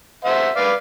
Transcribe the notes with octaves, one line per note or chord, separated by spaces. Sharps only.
C5 E5 F#5
B4 D5 F5